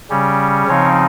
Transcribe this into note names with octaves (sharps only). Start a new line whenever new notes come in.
C#3 G3 C#4
C#3 F3 C4 D#4 C#5